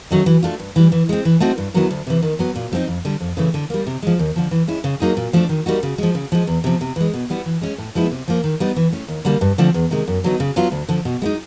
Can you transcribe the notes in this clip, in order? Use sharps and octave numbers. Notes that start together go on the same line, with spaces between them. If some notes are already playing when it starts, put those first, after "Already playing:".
D#3 F#3 A3 C#4
E3
A3 D4 F4
G2
E3 G3
E3
G#3 C4
E3
A3 C4 D#4 F#4
G2
D#3 F#3 B3 E4
D2
C3 E3
D#3
F#3 B3
A#2
F3 A3 C4 D#4
F2
D3 G3
F2
C#3 E3 A3
D3
G3 A#3
C3
F3 G#3
D#2
D3 F3
E3
G#3 C#4 E4
C#3
F#3 A#3 D#4 G#4
A#2
F3 A3 D4
D#3
G3 A#3 D#4 F#4
C#3
F3 G#3
C#3
F3 G#3
E2
C3 F3
C3
E3 G#3
B2
G3 B3 E4
E3
G#3 C#4
A2
F3 G#3 B3 E4
C3
F3 A#3
D#3
G3 B3 D#4
E3
A3 C#4
D#2
D3 G3 A#3
G2
D3 F3 A3 C4
E2
C3 D#3 G#3
F#2
D3 F#3 B3 D#4
C#3
F#3 B3 D4 F4
D2
D3 F3
B2
G#3 B3 D#4